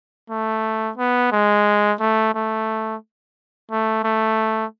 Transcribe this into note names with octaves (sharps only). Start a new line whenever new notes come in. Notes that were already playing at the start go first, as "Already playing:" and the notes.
A3
B3
G#3
A3
A3
A3
A3